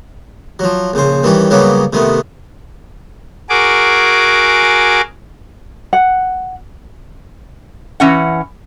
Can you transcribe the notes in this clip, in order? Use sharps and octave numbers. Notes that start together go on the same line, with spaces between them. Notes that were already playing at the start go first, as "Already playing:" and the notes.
F3 F#3
A#1 C#3 C5
D#3 E3 G3 C#4
C#3 F#3 G3 A#3 B3 C#4
C3 D#3 A3 B3
F#4 G#4 A#4 D6
F#5
E3 C#4 F#5